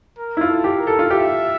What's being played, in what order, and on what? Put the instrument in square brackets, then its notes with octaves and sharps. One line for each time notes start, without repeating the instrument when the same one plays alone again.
[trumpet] A#4
[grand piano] E4
F4
[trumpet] A4
[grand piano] G4
[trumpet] A#4
[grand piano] A4
F4
[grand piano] G4 [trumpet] E5